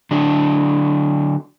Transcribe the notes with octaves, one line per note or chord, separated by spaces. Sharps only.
D3 F#3 D4